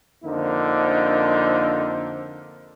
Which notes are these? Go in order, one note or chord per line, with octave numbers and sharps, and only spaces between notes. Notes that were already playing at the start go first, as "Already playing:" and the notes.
F2 D3 A#3 D#4 C5